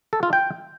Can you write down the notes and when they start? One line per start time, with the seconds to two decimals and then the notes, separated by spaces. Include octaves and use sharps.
0.13 A4
0.23 F4
0.33 G5